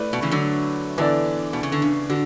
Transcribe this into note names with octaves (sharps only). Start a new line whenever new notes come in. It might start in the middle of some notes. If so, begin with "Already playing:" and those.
Already playing: A3 E4 B4 D5
B2
C#3 E3
D3 F#3
D3 E3 B3 D4 A4 D5
B2
C#3
D3
C#3
D3 F#4